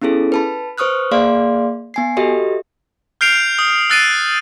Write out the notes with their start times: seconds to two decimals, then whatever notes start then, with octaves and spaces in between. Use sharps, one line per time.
0.02 B3 C#4 E4 G#4 A4
0.32 B4 A5 B5
0.78 B4 C5 C#6 D#6 F6 F#6
1.11 A#3 G#4 D5 F5 C6
1.94 B3 G#5 C7
2.17 F#4 G4 A4 D#5 E5
3.21 F6 G6 C7 D7 F7
3.59 D#6
3.90 E6 F#6 A6 C7 D7 D#7